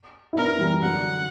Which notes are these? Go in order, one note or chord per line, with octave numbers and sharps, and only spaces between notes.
E4
B3 D4 A#4
E3 G3
D3 F#3 F#5